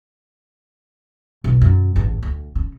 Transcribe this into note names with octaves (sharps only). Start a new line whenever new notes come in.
B1 F#2
F#2
A1 E2
D2
C#3